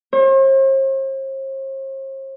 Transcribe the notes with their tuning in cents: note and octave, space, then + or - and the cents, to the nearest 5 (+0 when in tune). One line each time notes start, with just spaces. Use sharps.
C5 +45